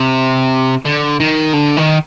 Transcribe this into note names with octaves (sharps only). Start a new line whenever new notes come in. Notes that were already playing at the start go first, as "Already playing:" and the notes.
Already playing: C3
D3
D#3
D3
D#3